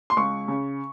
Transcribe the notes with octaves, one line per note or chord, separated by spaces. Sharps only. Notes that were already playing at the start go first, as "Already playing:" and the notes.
C6
C#2 C#6
C#3